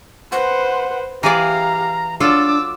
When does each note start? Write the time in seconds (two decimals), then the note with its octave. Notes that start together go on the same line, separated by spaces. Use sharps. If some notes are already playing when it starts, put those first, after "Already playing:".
0.32 B4 C5 F#5
1.23 E3 G4 G#4 D5 F5 A#5
2.20 F#3 D4 F4 A4 D6 E6